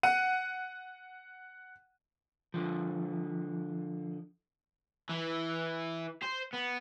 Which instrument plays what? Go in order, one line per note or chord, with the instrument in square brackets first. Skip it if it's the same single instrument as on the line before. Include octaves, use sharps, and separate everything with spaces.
[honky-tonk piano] F#5 D#7
[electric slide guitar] D3 F3
[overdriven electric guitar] E3
C5
B3